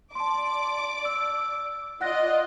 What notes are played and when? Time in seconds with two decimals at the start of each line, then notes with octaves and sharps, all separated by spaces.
0.15 D5 A5 C6 D6
1.05 E6
2.01 F4 D5 D#5 F#5 F#6 A#6